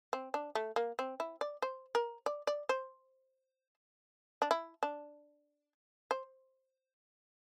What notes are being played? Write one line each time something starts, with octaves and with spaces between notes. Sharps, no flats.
C4
D4
A3
A#3
C4
E4
D5
C5
A#4
D5
D5
C5
D4
E4
D4
C5